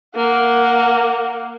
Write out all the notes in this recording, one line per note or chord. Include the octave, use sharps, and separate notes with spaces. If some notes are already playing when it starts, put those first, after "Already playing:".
A#3 F#5